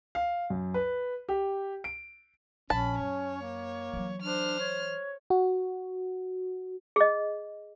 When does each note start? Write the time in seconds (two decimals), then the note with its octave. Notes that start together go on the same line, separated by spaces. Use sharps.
0.15 F5
0.50 F#2
0.74 B4
1.29 G4
1.84 D7
2.70 A#1 C#4 A5 B5
2.99 F#2 C#5
3.42 A#3
3.93 E3 F#3
4.22 D4 C5 F6
4.60 C#5
5.30 F#4
6.96 G#4 D#5